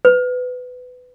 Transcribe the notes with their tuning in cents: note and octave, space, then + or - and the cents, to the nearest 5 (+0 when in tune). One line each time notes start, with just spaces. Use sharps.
B4 +20